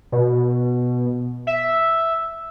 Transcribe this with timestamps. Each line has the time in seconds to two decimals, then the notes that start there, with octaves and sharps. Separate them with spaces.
0.12 B2
1.47 E5